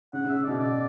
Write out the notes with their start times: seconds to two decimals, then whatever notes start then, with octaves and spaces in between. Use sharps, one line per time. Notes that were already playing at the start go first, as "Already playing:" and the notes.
0.13 C#3 F#5
0.25 C#3 E5
0.43 B2 D5
0.59 C#3 D5